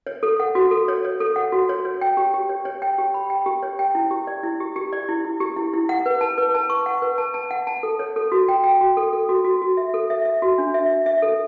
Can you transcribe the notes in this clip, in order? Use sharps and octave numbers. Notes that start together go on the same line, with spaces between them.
C#5
A4
F#5
F#4
A4
C#5
C#5
A4
F#5
F#4
C#5
C#5
G5
G4
G4
C#5
C#5
G5
G4
B5
G5
G4
C#5
G5
E4
G4
D5
E4
G4
G4
D5
E4
E4
G4
E4
E4
F#5
B4
A5
B4
A5
C#6
F#5
B4
A5
A5
F#5
A5
A4
C#5
A4
F#4
G5
G5
F#4
A4
A4
F#4
F#4
F#4
E5
A4
E5
E5
F#4
D4
E5
E5
E5
A4